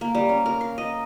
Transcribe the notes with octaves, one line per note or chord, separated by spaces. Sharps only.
A#3
G3
C#4
A#4
F5
D#5